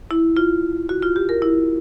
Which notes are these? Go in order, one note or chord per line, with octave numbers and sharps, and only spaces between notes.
E4
F4
F#4
F4
G4
A#4
E4